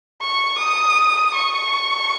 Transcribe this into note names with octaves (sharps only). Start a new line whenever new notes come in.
C#6
D#6
C#6